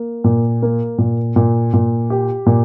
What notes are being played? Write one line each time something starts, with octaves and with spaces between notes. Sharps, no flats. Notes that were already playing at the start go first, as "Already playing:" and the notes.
Already playing: A#3
A#2
A#3
A#2
A#2
A#2
G4
A#2